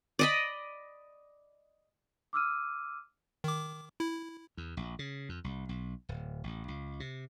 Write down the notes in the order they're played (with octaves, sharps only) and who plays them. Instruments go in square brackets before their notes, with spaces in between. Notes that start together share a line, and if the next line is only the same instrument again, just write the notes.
[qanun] D5 D#5 B5
[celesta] D6 E6 F6 D#7
[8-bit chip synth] D#3 D6
E4
[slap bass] E2
A#1
C#3
F2
C2
B1
D1
A1
C#2
C3